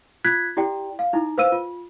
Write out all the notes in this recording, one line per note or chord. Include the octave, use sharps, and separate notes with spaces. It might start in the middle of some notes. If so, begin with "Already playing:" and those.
F4 F#6 G#6 B6
E4 G4 D5 G5
F5
D#4 E4
B4 C5 F5 E6 D#7
F4